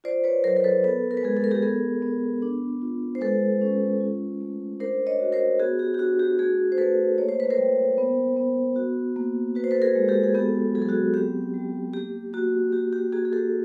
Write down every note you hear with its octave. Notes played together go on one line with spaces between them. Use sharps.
F4 C5 D5
B4 C#5
F#3 A#4 C5
A#4
A4 B4
B3 A4 B4
A#4
B4
G#3 G#4 A#4
A4
A#4
G4 A4
B3 G#4 A#4
B3
D4
F4
C5
G#3 A4 B4
C#4
F4
A3
D4 A#4 C5
C#5 D#5
F#4
A#4 C5
B3 F#4 G#4
G4
G4
D4 F#4
G4
A3 F#4 G#4
C5
A3 A4 B4
A#3 C#5
C5
B4
A#4 C5
G3
B3
B3
F#4
A#3
F#4 B4
C5
A4 B4
G#4 A#4
G#3
G4 A4
G#4
B3 G4 A4
F#3 G#4
A4
F#4 G#4
C4 G4
G3
A#3 G4
A#3 F#4
F#4 G4
G4
A#3 F#4 G#4
G#4
G4 A4